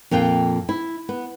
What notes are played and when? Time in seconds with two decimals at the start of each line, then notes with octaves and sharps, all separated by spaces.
0.11 F2 A#2 F5 G5
0.69 E4
1.09 B3